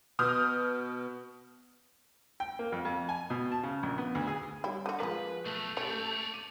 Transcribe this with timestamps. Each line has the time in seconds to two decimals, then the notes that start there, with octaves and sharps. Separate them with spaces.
0.19 B2 D#6 F6 G6
2.40 G5
2.59 A#3
2.72 F2
2.85 F2
3.09 G#5
3.30 B2
3.52 A5
3.63 C#3
3.83 A#1
3.98 B3
4.15 D2
4.27 G#4
4.64 G3 E4 C#5 G5
4.86 D3 F#4 D#7
5.00 F3 G#3 A#3 G#4 A#4 B4
5.46 B1 A3 A5
5.77 C#4 G4 A4 C#5 D5
6.32 D6 D#7